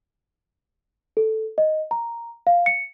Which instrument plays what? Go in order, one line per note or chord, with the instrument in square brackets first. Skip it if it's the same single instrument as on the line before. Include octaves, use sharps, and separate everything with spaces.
[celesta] A4
D#5
A#5
F5
C#7